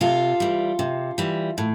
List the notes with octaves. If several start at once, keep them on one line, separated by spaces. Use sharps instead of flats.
C3 F4 A4
E3 G3
C3
E3 G3
A2